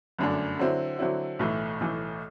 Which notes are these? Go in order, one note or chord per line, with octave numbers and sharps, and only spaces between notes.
G1 F#2 D3 A3 D4
D3 F#3 C4 E4
D3 F#3 C4 E4
B1 A2 E3 A3
B1 A2 E3 A3